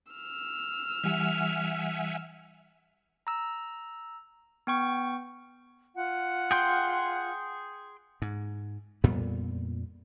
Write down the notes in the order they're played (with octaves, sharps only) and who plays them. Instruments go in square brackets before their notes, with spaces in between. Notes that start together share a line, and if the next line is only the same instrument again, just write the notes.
[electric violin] E6 F6
[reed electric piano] E3 G3 [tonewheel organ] E5 F#5 G#5
[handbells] A#5 E6
B3 G5 C#6
[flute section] F4 F#5
[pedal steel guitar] G#4 G5 C6
[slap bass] G#2
F2 A#2 G3 B3